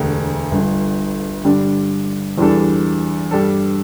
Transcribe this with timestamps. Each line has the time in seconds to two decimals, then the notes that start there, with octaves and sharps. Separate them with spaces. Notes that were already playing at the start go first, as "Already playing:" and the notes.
Already playing: E1 D2 D3 A3 G4
0.51 G1 G2 D3
1.44 G2 D3 G3 D4
2.38 E2 E3 G3 D4 A4
3.31 G2 G3 D4 A4